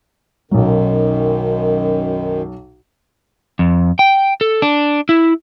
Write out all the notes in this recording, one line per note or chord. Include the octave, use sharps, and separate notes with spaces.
B1 F#2 D#3 F#3
F2
G5
A4
D4
E4